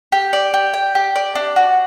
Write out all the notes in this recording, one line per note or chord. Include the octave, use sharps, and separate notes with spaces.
G4
D5
G4
G5
G4
D5
D4
F#4